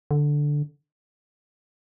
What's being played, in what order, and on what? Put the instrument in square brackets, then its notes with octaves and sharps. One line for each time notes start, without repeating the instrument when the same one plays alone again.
[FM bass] D3